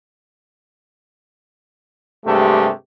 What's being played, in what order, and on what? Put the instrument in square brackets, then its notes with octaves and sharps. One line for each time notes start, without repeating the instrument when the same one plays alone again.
[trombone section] G2 C3 G#3 A3 G4